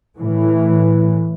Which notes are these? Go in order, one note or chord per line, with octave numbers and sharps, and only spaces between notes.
A2 E3